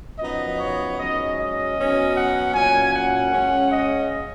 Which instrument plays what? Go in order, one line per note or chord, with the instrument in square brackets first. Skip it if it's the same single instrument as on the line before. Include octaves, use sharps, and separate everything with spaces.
[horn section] F#2 F3 B3 D#4 D#5
C#5
G#2 F#3 C#4 D#5
D#5
B2 F#3 C#4
F#5
A#2 F#3 C#4 G#5
F#5
C#3 G#3 C#4
D#5